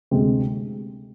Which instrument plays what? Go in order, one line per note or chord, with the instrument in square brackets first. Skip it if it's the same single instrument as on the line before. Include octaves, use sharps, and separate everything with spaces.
[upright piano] D2 C3 G#3 C4